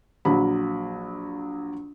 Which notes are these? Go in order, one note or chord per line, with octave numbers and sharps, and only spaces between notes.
A#1 F#3 B5